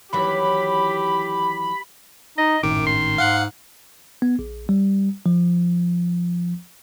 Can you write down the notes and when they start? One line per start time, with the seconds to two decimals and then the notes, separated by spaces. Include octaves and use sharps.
0.13 D#2 E3 F#3 G4 B5
2.38 D#4 D#5
2.63 G#1 F#2 A2 D#3 C#4 D6
2.87 C6
3.18 G#2 F5 F#5 F#6
4.22 B3
4.39 A#1
4.69 G3
5.26 F3